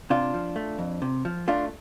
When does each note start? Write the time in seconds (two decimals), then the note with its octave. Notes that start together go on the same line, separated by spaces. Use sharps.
0.10 C3 D4 F4
0.34 F3
0.56 A3
0.79 F2
1.02 C3
1.25 F3
1.48 A3 D4 F4